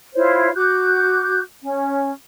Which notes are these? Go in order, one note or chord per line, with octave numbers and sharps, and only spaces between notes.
E4 F4 C5 C#5
F#4 D6 F#6 G6
C#4